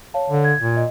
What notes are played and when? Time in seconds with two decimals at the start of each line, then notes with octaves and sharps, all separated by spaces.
0.14 C#5 F5 A5
0.30 D3
0.44 G#6
0.59 A#2
0.77 D#5